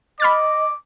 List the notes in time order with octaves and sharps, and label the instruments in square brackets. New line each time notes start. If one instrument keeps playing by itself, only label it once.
[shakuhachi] D#5 [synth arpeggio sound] B5 F6 A6 [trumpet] D6